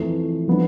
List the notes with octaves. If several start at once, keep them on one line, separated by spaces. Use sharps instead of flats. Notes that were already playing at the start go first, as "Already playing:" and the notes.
Already playing: F2 E3 A3
F3 B3 D4